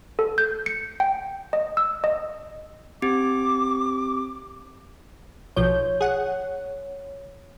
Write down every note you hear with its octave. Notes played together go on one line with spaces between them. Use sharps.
A4
G6
C#7
G5
D#5
E6
D#5
C4 G4 D6
B1 F3 C#5 G6
G#4 F#5